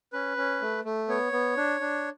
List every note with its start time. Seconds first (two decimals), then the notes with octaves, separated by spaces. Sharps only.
0.13 C#4 B4
0.37 C#4
0.62 A3
0.85 A3
1.08 B3 C#5
1.32 B3
1.57 D4
1.81 D4